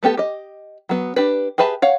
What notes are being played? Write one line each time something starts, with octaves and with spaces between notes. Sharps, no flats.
A3 B3 G4 A4
G4 D#5
F#3 B3
D4 G4 B4
G4 G#4 B4 E5 A5
C#5 F5 F#5